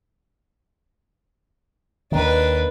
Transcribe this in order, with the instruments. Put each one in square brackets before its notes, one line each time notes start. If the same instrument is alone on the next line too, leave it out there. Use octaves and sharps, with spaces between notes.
[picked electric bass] D#2 D#3 [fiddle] D4 B4